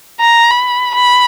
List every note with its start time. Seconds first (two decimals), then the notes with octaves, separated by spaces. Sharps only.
0.20 A#5
0.51 B5
0.95 B5